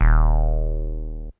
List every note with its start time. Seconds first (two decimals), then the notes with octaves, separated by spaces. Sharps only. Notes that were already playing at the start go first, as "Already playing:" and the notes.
0.01 D#1